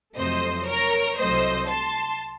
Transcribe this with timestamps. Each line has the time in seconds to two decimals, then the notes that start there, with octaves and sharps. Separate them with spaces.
0.16 F2 C3 F#3 A3 C5 D#5
0.67 A#4 C#5
1.19 C2 C3 F#3 A3 C5 D#5
1.69 A5 C6